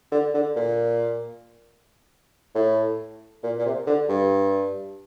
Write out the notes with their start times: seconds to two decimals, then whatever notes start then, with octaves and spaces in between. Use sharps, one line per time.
0.12 D3
0.34 D3
0.56 A#2
2.55 A2
3.43 A#2
3.59 A#2
3.66 C3
3.87 D3
4.09 G2